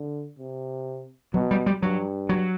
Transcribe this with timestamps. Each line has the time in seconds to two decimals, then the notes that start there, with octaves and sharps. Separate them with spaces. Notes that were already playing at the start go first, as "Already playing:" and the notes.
Already playing: D3
0.39 C3
1.34 B2 F#3
1.51 G3
1.66 G3
1.82 G2 F#3
2.29 F#3